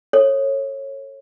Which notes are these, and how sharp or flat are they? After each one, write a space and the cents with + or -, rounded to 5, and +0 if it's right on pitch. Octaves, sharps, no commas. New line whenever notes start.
A4 +20 C#5 -20